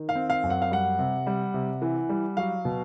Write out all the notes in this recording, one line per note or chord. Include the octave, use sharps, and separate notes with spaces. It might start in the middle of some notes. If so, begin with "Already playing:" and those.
Already playing: D#3
F5
C4
F5
F#2
F#5
F5
G3 F#5
C3
G3
C3
E3
G3
F#3 F5
B2